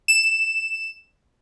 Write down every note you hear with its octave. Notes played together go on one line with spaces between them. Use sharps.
E7